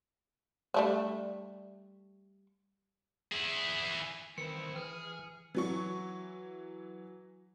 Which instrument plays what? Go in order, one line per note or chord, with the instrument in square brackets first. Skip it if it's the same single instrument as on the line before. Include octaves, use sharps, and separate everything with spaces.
[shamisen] G3 A3 D4
[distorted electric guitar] E4 G#4
[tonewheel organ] D#3 E3 [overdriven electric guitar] C4 E4 [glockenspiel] C#7
[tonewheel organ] E3 F6 [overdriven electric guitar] G#4
[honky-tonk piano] E3 F#3 C#6